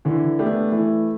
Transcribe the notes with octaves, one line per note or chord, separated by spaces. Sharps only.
D3 E3
A3 B3 D4 G4
E3 A3